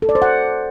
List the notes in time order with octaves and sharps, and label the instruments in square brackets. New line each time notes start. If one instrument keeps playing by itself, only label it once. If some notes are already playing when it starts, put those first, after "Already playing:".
[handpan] A4
D5
C5
F#5